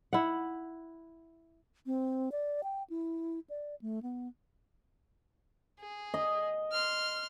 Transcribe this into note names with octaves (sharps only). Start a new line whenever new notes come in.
E4 F#5
C4
D5
G5
E4
D5
A3
B3
G#4
D#5
C6 F6